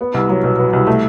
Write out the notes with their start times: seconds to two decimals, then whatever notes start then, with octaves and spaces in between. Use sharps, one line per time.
0.01 B3
0.14 C2
0.29 F#3
0.44 B2
0.58 B3
0.73 C2
0.87 A3